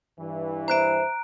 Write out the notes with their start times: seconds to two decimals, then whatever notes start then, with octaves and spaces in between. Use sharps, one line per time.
0.17 G2 E3
0.68 C5 E5 A#5 F#6 D7